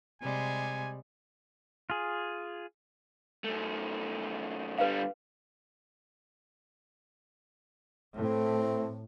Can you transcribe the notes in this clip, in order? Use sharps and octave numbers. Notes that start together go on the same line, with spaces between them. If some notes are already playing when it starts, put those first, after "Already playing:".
C3 G3 G#3 G#5
F4 G#4
F#2 A3
D3 G3 B4 F5
A2 A3 C4